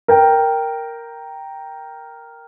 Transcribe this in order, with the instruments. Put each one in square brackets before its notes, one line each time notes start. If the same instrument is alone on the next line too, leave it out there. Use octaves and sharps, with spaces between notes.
[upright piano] A#4 G5